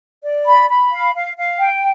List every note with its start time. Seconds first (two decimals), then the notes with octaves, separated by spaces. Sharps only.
0.24 D5
0.47 B5
0.70 B5
0.92 F5
1.15 F5
1.37 F5
1.60 G5